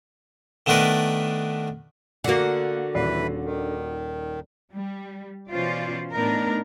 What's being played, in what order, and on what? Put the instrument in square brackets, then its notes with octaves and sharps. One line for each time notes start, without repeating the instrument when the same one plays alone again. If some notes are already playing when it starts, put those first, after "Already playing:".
[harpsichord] D#3 A3 B3 D4 A#4 B4
[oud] D3 A#3 [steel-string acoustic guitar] F#4 F#5
[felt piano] D#1 D5 C7 [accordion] E3 B4
[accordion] D#3
[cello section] G3
B2 E3 C#4 F4 C5 D5
A2 B3 D4 D#4 A#4